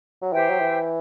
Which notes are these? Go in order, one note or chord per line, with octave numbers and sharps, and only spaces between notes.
F#3
E3 G4 C5 E5 G5
F#3
E3